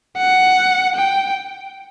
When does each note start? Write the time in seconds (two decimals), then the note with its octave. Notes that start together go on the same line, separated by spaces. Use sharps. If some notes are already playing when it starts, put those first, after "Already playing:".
0.17 F#5
0.96 G5